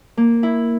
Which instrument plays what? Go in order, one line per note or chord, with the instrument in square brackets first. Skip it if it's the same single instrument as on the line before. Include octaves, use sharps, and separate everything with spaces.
[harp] A#3
E4